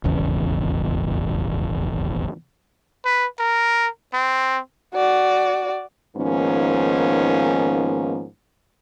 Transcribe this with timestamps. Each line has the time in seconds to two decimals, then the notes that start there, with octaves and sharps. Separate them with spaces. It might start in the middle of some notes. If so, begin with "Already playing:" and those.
0.04 D#1 G#1 E2 C#3
3.05 B4
3.39 A#4
4.14 C4
4.94 F#4 D5
6.16 G#2 D#3 F3 A#3 B3 C#4